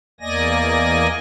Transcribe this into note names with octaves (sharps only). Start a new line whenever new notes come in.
E2 A#3 D5 D#5 G#5 A#6